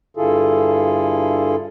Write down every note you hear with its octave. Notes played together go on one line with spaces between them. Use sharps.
G2 D3 E4 F4 G#4 A4